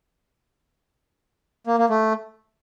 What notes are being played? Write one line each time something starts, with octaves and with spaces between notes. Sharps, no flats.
A#3
A#3
A3